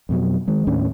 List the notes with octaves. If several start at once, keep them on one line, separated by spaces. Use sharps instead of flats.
F2 B2 F#3
D#3 G#3
D#2 A2 C#4 D4